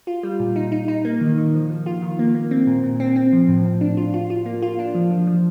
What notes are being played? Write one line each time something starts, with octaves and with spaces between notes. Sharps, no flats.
F4
G3
A#2
D#4
D#4
D#4
A#3
D#3
D#3
F3
F3
F4
D#3
A#3
A#3
C4
A#2
A#2
C4
C4
F3
A2
A2
D4
F4
F4
F4
A#3
F4
D4
F3
F3
F3